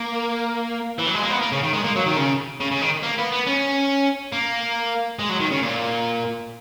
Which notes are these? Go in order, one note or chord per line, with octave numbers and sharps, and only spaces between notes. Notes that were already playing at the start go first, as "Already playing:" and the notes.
Already playing: A#3
E3
F#3
G#3
A#3
B3
A#3
C#3
D#3
G#3
A#3
F#3
D#3
C#3
C#3
C#3
D#3
A#3
B3
B3
C#4
A#3
G#3
F#3
D#3
C#3
A#2